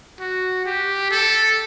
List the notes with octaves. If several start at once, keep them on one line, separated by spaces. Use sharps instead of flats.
F#4
G4
A4